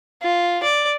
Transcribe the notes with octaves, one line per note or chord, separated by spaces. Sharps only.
F4
D5